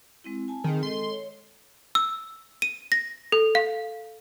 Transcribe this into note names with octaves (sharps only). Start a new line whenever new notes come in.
G#3 C4 E4
G#5 A5
D#3 C4 G#4
G#3 A4 D#5 C6
C#5
E6
D#7
A#6
A4
F5